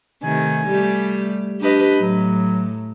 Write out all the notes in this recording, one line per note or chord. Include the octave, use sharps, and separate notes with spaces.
C3 D#3 A3 G#5
G3 A3 G4
D4 G4 B4 D#5
A2 F#3